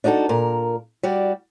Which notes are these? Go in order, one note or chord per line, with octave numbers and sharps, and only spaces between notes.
D4 D#4 F#4 G#4 A4
A#2 A#4
G3 F#4 D5